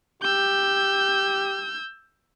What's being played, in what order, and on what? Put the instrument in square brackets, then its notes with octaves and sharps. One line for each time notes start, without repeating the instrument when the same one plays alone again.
[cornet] G4 [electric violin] E6 G6